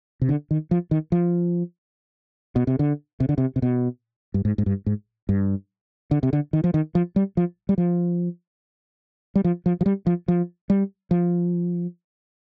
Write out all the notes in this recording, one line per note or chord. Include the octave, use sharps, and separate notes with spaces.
C3
D3
D#3
F3
D#3
F3
B2
C3
D3
C3
D3
C3
C3
B2
G2
G#2
G#2
G2
G#2
G2
D3
C3
D3
D#3
F3
D#3
F3
G3
F3
G3
F3
G3
F3
F3
F3
G3
F3
F3
G3
F3